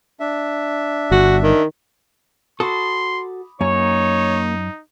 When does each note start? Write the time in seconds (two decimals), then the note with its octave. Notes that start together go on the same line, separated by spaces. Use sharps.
0.20 D4 E5
1.12 G1 F#4
1.43 D#3
2.60 F#4 A4 B5 C6 D6 D#6
3.61 F#2 A#3 D#4 C#5 G#5 A#5